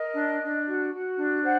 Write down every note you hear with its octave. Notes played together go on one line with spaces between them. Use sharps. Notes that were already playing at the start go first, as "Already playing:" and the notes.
Already playing: A#4 D#5
D4
D4
F#4
F#4
D4
C5 F#5